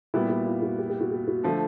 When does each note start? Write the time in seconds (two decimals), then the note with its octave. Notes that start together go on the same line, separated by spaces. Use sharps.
0.14 A#2 G3 B3 E4 F#4
0.30 F#4
0.46 F4
0.62 F#4
0.78 G4
0.89 G4
1.00 F#4
1.11 G4
1.28 F#4
1.43 D3 F3 A3 F4